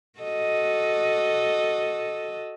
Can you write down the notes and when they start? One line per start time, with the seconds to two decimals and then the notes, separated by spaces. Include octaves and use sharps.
0.19 F#4 A4 D#5